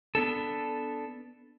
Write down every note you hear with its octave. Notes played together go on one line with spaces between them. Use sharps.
B3 D4 A4